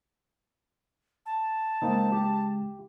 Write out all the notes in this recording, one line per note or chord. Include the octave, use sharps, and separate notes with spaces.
A5
C#3 G#3 A#3 C4 D#4
G4